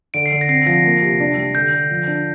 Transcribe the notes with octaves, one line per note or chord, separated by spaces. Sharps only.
D3 D7
C7
D3
A#6
C4 C7
F3 A#6
A#3
C3
D4
G3
D3 G6
D3
F3
D4